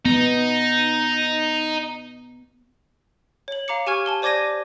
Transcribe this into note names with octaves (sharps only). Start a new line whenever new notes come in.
B3 D#4
C#5 F#7
F5 A#5 D6 C#7
G4 G#5 C#6 F6 G#6
G#5 A5 G7
C5 D5 D6 G#6 A#6 D#7